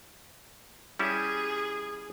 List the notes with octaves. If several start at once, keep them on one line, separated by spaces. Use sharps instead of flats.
G3 C#4 E4 G#4